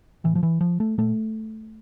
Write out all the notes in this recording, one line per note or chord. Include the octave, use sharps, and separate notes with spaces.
A2 E3
F3
E3
F3
A3
A#2 A3